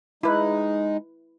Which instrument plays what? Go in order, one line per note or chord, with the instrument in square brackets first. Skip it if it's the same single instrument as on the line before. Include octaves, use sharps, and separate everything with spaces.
[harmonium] G#3 D#4 [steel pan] E4 B4